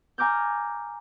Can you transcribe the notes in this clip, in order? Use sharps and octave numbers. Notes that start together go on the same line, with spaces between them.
G#5 A#5 D6 F6 G6